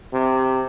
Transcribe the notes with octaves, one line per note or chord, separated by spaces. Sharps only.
C3